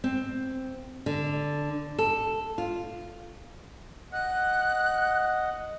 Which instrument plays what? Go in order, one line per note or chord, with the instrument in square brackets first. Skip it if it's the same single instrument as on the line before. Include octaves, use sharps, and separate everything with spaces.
[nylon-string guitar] C4
D3
A4
F4
[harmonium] D#5 F#5 [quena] F#6